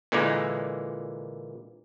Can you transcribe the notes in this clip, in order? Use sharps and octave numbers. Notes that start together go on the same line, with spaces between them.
A#2 D3 E3 G#3 A#3